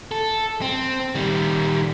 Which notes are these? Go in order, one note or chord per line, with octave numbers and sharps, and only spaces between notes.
A4
C4
D#3 G3